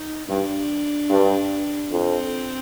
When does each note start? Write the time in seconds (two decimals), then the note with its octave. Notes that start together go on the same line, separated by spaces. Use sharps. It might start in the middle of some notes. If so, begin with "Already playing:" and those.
Already playing: D#4
0.29 G2 D4
1.10 G2
1.91 F2 C4